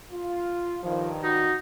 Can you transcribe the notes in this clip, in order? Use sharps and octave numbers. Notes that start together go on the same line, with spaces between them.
F4
G2 D#3 F3
D#4 F#4